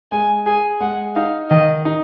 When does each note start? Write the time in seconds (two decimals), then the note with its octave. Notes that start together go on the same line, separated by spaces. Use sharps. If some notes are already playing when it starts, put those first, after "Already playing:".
0.12 G#3 G#5
0.46 G#4 G#5
0.80 G#3 F#5
1.15 D#4 F5
1.50 D#3 D#5
1.85 D#4